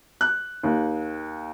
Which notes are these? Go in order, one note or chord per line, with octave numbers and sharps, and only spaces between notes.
F#6
D#2